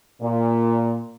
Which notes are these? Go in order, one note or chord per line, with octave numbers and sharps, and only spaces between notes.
A#2